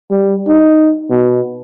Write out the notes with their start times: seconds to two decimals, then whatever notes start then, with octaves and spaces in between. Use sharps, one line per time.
0.11 G3
0.47 D#4
1.10 B2